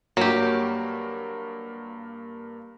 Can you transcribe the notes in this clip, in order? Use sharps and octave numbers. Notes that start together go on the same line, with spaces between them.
G2 F#3 A#3 G4